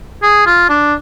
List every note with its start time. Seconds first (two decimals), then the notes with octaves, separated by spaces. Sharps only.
0.23 G#4
0.47 F4
0.69 D4